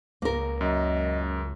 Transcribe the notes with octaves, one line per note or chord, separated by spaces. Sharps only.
C#2 A#3 A#4
F#2 D#5